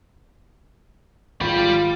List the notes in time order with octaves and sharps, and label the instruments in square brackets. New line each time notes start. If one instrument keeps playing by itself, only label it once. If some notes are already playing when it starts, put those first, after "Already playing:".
[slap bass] G#1 [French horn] F4 [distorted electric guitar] G4 B5